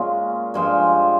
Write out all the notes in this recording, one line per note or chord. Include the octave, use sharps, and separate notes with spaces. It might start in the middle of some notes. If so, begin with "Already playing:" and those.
Already playing: A#2 G#3 C#4 F4
G2 F3 G#3